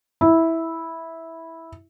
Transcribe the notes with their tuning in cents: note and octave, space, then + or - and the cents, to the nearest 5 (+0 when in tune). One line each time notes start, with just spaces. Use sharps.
E4 -10